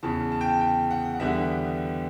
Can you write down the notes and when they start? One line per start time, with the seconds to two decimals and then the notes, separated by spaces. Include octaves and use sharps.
0.03 E2 C#3 E3 A5
0.32 A5
0.41 G5
0.49 A5
0.61 G5
0.91 F#5
1.14 F#5
1.20 E2 D3 G3 B3 E5